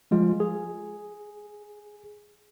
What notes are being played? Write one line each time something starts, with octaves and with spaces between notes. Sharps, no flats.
F3 G#3 F4
G#4